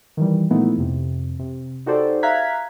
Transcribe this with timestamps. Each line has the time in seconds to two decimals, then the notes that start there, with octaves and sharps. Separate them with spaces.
0.17 D#3 E3 G3
0.50 A#2 F3 A3 B3 D#4 E4
0.77 F2 C3
1.39 C3
1.86 D#4 F#4 G4 A4 C5 D5
2.23 E5 F5 A#5 F#6 G#6 B6